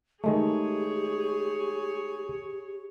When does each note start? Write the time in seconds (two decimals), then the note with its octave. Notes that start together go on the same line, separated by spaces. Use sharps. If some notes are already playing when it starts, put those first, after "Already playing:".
0.24 D#3 G#3 A3 G4 G#4 C#5